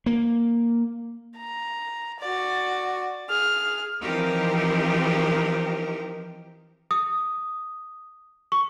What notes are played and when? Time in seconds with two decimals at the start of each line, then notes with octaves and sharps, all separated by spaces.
0.06 A#3
1.37 A#5
2.20 F#4 D5
3.30 G#4 F6
4.02 E3 F3 C4 D#4 G4 A#4
6.91 D#6
8.52 C#6